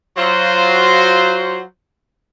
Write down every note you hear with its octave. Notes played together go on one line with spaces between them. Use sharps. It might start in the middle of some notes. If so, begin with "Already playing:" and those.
F#3 F4 C5